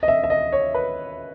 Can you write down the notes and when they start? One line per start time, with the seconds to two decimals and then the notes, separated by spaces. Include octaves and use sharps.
0.03 D#5
0.08 E5
0.24 E5
0.30 D#5
0.52 C#5
0.74 B4